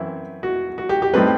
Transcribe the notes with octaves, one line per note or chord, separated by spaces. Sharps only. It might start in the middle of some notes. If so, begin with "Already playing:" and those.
Already playing: F#2 E3 C4 E4
F#4
F#4
G4
G4
A2 G3 C4 D#4 B4